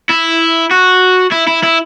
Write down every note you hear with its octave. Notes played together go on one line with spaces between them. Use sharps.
E4
F#4
E4
E4
E4